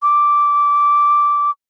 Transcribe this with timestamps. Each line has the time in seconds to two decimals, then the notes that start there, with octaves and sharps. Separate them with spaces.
0.02 D6